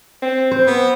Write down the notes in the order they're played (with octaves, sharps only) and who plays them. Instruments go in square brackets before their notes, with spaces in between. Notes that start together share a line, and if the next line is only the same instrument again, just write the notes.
[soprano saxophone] C4
[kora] C5
[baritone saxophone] B3